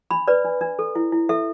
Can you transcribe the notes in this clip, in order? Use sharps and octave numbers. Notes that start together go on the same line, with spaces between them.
D4 B5
B4 D5
D4
D4
A4
E4
E4
A4 E5